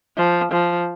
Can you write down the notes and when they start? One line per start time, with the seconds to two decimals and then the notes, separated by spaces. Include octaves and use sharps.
0.17 F3
0.52 F3